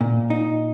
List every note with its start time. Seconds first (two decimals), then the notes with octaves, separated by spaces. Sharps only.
0.01 A#2
0.30 D#4